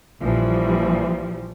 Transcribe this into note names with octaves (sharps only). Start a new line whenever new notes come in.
A#1 E3 F3 G3